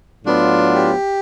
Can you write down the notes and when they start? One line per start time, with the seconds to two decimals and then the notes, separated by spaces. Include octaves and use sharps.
0.25 A2 F#3 B3 D4 F4
0.74 G4